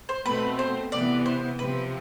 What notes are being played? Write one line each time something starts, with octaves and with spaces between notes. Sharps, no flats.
C5
B2 A3 C4 B4
C5
C3 E3 B3 D5
C5
C3 F3 C4 B4